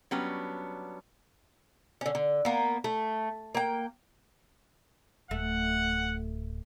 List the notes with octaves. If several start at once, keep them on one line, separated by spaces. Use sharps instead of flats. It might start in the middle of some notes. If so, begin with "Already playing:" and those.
F#3 G3 B3 C#4 D4
D3 C#4
D3
A#3 B3
A3
A#3 G5
D1 A3 F#5